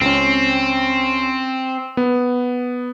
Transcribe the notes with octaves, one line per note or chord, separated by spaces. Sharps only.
C#2 C4 C#4
B3